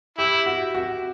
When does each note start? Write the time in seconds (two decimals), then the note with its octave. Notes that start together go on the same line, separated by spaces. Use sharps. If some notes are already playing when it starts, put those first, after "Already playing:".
0.18 E4 G4
0.46 F#4
0.75 F#4